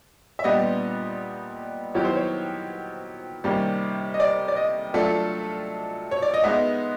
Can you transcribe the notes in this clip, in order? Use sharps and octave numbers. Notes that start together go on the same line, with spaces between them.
E5
A#2 G3 B3 D4 G4 D#5
D#3 F#3 B3 E4 G4 C#5
C5
C#5
C3 D#3 G3 A#3 C#4
D#5
D5
D5
D#5
F#3 A3 D4 F4 A4 E5
C#5
D5
D#5
G#3 B3 D#4 E5